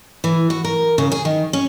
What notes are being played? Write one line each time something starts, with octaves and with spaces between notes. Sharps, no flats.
E3
F#4
A#4
C#3
G#4
D#3
C#4